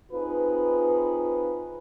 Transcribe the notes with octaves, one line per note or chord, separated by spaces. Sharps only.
C4 D#4 F4 G#4 B4